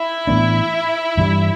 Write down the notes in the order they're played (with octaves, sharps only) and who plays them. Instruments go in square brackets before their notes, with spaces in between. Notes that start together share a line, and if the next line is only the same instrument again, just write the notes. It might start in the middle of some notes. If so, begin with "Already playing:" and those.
Already playing: [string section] E4
[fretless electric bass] A2 E3 B3 D4
G2 E3 G3